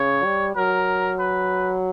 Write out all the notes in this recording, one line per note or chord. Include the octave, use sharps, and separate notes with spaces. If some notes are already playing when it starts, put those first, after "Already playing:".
Already playing: C#3 C#5
G3
F#3 A#4
B4